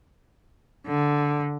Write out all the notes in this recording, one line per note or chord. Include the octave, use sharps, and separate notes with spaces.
D3